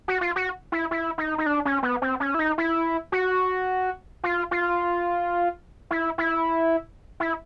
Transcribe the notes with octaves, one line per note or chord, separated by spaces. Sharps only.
F#4
F4
F#4
E4
E4
D#4
D#4
D4
C#4
B3
C4
C#4
E4
D#4
E4
F#4
F4
F4
E4
E4
E4